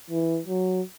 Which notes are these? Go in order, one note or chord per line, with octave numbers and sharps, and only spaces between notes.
E3
F#3